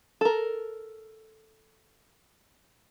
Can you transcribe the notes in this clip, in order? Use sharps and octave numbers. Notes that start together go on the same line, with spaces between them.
A4 A#4